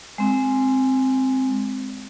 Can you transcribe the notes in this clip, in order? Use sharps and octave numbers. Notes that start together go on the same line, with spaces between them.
G#3 C4